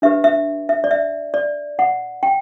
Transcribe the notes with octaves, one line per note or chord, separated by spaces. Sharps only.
D4 G4 B4 E5
E5
E5
D5
E5
D5
F#5
G5